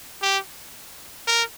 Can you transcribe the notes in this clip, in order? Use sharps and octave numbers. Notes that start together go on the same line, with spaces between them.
G4
A#4